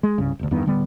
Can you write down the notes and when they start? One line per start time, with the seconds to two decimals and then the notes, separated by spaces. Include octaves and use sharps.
0.03 G#3
0.18 C2 G2 C#3
0.39 E1 D2
0.51 E2 G2 D#3 B3
0.66 D1 D3 G3 B3